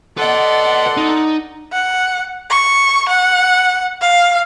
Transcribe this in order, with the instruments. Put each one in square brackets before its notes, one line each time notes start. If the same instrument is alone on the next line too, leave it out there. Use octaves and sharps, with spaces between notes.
[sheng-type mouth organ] A4 C6 [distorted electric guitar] B4 D#5 [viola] D5 F#5
[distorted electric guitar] D#4
[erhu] F#5
C#6
F#5
F5